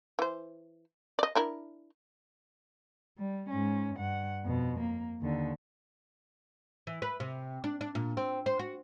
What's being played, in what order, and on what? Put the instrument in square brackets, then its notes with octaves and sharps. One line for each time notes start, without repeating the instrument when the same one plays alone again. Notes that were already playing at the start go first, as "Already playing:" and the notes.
[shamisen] E3 C5
D5 D#5
D4 E4 A#4
[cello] G3
G#2 C#4
G2 F#5
F2 B2
A#3
D#2 D3
[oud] E3
B4
C3
D4
D4
A#2
C4
C5
F#4